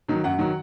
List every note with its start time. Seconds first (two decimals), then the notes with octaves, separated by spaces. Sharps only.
0.08 D#3 F#3
0.24 F#2 F#5
0.39 D#3 F#3